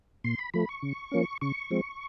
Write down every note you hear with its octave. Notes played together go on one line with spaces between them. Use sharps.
A#2 C6
B5
F3 A3 B5
C#6
C#3
F3 A#3 C#4
C#3 C#6
F3 G#3 C4